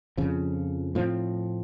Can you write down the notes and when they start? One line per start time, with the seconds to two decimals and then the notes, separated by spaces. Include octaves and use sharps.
0.17 F2 C#3 F3
0.95 A2 F3 C4